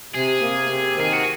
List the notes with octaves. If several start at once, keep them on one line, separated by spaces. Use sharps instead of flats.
C3 G#4
A#3
C3
D#3 G#4
F#4